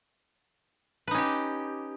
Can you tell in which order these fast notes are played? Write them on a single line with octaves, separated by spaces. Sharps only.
B4 D#4 C#4 G4